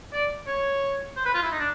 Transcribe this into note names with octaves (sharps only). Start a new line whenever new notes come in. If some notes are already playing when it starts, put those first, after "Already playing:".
D5
C#5
C5
B4
F4
E4
D#4
D4